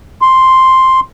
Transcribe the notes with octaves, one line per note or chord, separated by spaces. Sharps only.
C6